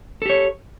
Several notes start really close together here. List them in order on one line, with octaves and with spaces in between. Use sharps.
A4 G4 C#5